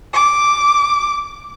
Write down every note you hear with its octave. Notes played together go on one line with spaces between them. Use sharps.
D6